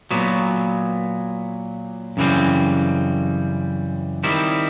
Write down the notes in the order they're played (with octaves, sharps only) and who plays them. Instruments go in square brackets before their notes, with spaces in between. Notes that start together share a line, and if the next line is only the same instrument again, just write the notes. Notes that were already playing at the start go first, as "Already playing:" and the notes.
[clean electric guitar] A#2 F#3 B3
F#2 C#3 E3 G3 C4
D#3 G3 C4 E4